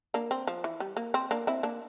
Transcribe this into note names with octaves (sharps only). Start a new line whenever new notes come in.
A#3 D4
C4
F3
E3
G3
A#3
C4
A#3 D4
C4 E4
A#3 D4